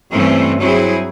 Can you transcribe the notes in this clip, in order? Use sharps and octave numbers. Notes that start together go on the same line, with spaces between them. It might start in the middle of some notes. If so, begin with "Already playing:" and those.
G2 E3 A3 C4 C#4
F#3 C4 E4 G#4